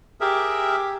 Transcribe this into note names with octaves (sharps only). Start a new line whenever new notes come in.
G4 G#4 A#4 E5